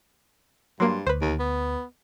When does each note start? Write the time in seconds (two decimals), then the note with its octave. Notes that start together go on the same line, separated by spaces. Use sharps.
0.80 G2 F#3 A#3 C6
1.07 D2 B4 C5
1.22 D#2
1.40 B3